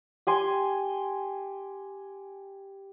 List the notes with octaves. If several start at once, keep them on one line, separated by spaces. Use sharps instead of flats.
G4 G#5 C6